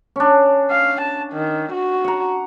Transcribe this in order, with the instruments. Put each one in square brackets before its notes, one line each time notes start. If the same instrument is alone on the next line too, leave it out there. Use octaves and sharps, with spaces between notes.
[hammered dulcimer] C#4 D4
[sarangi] F5
A5
D#3
F#4
[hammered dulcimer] F#5 A#5